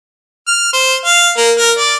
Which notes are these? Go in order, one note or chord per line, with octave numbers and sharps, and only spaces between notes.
F6
C5
F5
A#3
A#4
D5